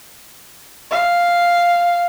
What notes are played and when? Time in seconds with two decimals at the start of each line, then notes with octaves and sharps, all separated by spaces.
0.91 F5